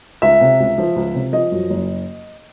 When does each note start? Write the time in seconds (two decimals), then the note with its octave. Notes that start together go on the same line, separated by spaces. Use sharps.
0.22 C#2 E5
0.41 C3
0.60 C#2
0.78 F3
0.96 C#2
1.15 C3
1.32 F3 D#5
1.52 F#2
1.70 F#1